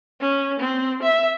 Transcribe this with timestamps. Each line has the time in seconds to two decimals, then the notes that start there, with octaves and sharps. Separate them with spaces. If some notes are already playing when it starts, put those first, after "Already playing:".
0.21 C#4
0.59 C4
1.03 E5